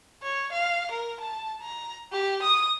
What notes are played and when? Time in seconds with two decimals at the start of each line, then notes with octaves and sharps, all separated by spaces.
0.23 C#5
0.52 F5
0.91 A#4
1.21 A5
1.62 A#5
2.12 G4
2.43 D#6